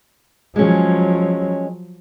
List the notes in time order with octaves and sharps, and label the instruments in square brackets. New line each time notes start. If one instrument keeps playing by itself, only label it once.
[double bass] F3 F#3 [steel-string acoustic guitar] G#3 C#4